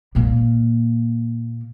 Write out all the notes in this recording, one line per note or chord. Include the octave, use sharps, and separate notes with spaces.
A#2 A#3